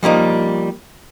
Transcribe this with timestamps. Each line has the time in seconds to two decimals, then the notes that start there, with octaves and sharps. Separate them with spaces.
0.03 F3 G3 A#3 D#4